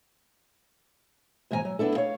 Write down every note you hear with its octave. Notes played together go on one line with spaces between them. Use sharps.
D#2 G#2 E3 F5 G#5 A#5
F#3
B3 D4 E4 A4
C#5 F5